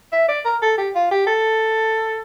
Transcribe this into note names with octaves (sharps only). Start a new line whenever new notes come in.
E5
D5
A#4
A4
G4
F4
G4
A4